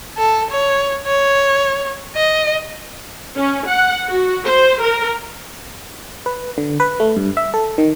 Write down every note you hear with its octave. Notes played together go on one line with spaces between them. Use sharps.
A4
C#5
C#5
D#5
C#4
F#5
F#4
C5
A#4
B4
D3
B4
A3
G2
E5
A4
D#3